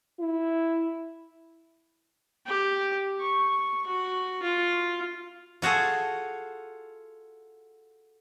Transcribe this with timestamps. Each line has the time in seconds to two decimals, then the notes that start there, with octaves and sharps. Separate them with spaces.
0.20 E4
2.46 G4
3.21 C#6
3.86 F#4
4.42 F4
5.62 F4 F#4 G#4 A4